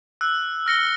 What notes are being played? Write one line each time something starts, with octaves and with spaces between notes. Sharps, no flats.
E6 F#6
F6 A#6 C#7 G7